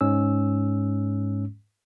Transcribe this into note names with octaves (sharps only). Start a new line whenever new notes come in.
G#2 G#3 C#4 E6